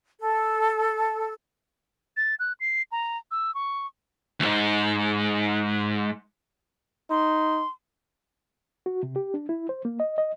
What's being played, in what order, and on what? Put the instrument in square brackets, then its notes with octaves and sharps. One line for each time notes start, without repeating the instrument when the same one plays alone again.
[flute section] A4
[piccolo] A6
F#6
C7
A#5
E6
C#6
[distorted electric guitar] D2 G#2
[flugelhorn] D#4 [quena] C6
[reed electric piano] F#4
C3
G4
D4
E4
C5
A#3
D#5
D#5